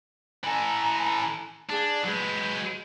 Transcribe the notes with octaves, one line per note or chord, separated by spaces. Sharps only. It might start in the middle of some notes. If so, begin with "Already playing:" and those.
E3 A4 G#5 A#5
D4 G#4 F5
F#3 G#3 B4 G6